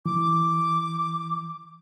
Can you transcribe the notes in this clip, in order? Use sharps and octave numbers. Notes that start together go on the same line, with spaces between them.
E3 D6